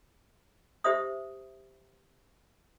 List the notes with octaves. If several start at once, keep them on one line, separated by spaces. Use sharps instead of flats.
G4 C5 E5 D#6